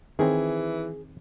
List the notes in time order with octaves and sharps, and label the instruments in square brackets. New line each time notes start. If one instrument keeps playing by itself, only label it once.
[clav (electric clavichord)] D#3 C4 [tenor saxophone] E3 [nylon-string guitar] G#4